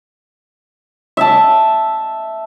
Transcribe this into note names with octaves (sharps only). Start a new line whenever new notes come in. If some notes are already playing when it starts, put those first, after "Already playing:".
E5 A5